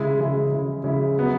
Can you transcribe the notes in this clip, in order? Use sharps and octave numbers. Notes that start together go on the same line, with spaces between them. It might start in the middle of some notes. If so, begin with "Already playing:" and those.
Already playing: C#3 G#3 E4
C#3 G#3 E4
C#3 G#3 E4
C#3 G#3 E4
F#3 B3